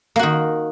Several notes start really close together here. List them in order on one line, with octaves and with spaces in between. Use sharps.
A#3 F#4 D#3